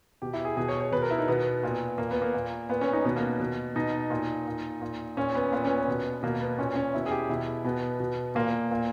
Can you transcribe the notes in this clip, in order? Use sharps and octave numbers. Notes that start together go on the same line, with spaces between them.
B2 G4
E4
G#4
B2 G#4
C#5
C#5
B2 B4
A#4
E4
D#4
B2 B3
A#2
A#2 A#3
B3
A#3
A#2
A#2 B3
C#4
D#4
B2 B3
A#3
B2
B2 D#4
A#2
A#2
A#2
A#2 C#4
B3
A#2 B3
C#4
B3
B2
B2 A#3
B3
A#2 C#4
C#4
B2 E4
G#4
G4
B2 E4
B2 B3
B2
A#2 A#3
A#2